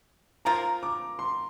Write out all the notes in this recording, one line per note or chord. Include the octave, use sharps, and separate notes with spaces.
F3 A#3 F4 A#4 A#5
D6
C6